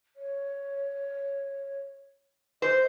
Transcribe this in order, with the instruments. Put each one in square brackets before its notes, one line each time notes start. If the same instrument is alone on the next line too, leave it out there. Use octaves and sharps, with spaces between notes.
[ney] C#5
[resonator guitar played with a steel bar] C5 [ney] D#5